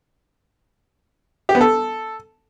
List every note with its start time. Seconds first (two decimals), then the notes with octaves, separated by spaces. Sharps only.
1.49 G4
1.55 B3
1.61 A4